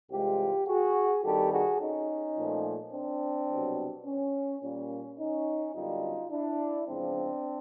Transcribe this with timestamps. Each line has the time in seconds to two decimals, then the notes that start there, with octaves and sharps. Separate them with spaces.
0.10 C2 C3 E3 G#3 F4 G4
0.66 F#4 G#4
1.23 G2 D#3 G3 C4 G4 A4
1.51 F#4 G#4
1.79 C#4 D#4
2.36 A#2 F3 A3
2.92 C4 D4
3.49 C2 B2 F#3 B3
4.05 C#4
4.61 A#2 G3 A#3 C#4
5.18 C#4 D#4
5.75 F#2 D3 G3 B3 D#4 F4
6.31 D4 E4
6.87 E2 C#3 F3 G#3 C4 D4